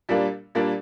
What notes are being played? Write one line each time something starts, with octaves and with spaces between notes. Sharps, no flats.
A#2 G3 A#3 D4
A#2 G3 A#3 D4